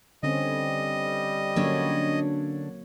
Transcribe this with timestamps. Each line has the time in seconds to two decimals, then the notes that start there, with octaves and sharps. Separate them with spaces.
0.23 D3 G3 C4 C#4 D#5
1.56 D3 F#3 A#3 C#4 D4 C#5